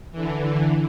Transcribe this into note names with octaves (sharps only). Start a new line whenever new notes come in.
D3 E3